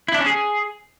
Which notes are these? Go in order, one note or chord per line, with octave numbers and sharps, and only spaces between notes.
E4
D4
C#4
G#4